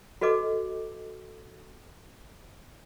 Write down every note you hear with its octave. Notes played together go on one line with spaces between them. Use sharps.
F#4 A4 B4 D#5 D6